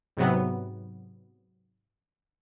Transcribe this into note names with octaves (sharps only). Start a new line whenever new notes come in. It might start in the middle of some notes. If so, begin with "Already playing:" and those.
G#2 C3 F#3 B3